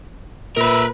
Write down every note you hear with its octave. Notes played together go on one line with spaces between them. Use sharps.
A#2 A#4 B4 E5